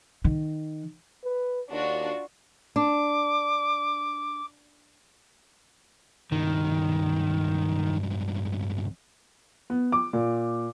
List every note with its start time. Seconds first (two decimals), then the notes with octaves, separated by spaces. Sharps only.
0.24 D#3
1.24 B4
1.70 D#2 D4 F4 F#4
2.76 D4 D6
6.32 C#2 G2 D#3
9.70 B3
9.92 D6
10.13 A#2